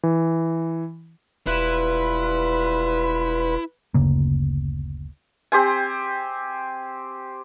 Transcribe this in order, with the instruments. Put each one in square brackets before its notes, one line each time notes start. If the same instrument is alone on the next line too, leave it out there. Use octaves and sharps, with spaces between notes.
[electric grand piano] E3
[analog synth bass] E1 [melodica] G3 F4 [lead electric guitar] E4 [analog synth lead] B4
[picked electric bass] F#1 D2 C#3 A#3
[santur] C4 G4 C5 G#5